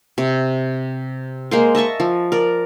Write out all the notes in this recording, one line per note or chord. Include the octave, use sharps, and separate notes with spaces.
C3
G#3 A#3 C5
D#5 E5 A5 C#6
F3
A#4 D5